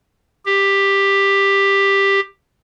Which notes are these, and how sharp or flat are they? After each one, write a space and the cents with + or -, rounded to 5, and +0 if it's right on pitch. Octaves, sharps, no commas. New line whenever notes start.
G4 +10